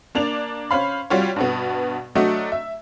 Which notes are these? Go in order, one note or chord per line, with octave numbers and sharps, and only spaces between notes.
A#3 D4 D5 F7
C#4 C5 F5 B5
G3 F4 F#4 C#5
G2 B2 B3
F#3 A3 D4 F#4 D#5 E5
E5